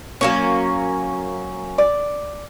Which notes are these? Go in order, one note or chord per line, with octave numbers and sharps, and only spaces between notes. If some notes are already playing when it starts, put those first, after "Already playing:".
F#3 A#3 C#4 C#5
D5